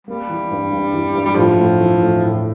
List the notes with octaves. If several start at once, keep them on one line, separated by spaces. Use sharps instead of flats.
G3 A#3
E3
G2
G2
E3
G2
G3
A2 F3
A2
E3
A2
A2